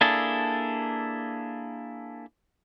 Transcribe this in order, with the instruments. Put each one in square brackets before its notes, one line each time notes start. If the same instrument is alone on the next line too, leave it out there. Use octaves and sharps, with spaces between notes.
[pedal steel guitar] A#3 D4 E4 G#4 A4